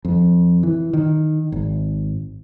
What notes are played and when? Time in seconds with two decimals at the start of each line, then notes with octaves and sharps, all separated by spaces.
0.05 F2
0.63 E3
0.93 D#3
1.52 G#1